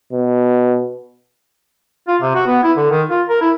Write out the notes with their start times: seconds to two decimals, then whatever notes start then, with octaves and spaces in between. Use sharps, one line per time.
0.12 B2
2.08 F4
2.21 C3
2.35 F#4
2.46 B3
2.63 E4
2.76 D3
2.90 D#3
3.09 F4
3.29 A#4
3.41 E4